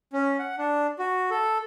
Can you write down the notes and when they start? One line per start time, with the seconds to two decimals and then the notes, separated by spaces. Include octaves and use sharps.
0.13 C#4
0.39 F#5
0.58 D4
0.99 F#4
1.31 A4